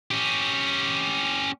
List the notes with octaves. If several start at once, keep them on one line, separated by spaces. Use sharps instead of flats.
C#4 G4